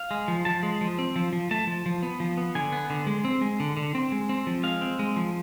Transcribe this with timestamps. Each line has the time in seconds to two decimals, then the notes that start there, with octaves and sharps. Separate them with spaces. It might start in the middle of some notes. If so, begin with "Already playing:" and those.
Already playing: F5
0.11 G#3
0.28 F3
0.45 F3 A5
0.63 G#3
0.81 F3
0.99 C4
1.16 F3
1.33 F3
1.51 A3 A5
1.67 F3
1.86 F3
2.03 B3
2.20 F3
2.37 B3
2.55 D3 G#5
2.72 B3
2.90 D3
3.07 G#3
3.25 C4
3.41 G#3
3.60 D3
3.77 D3
3.95 C4
4.12 G#3
4.29 C4
4.47 F3
4.63 G#3 F5
4.82 C4
4.99 G#3
5.16 F3